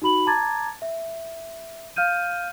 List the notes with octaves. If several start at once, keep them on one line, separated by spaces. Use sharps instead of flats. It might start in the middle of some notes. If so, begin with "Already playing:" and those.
D#4 F#4 B5 F#7
A5 A#5 D6 G#6 A6
E5
F5 F6 G6 D#7